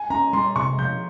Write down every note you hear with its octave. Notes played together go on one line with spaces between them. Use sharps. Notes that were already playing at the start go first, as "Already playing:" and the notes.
Already playing: G#5
C#4 A#5
G3 C6
C3 C#6
F3 G6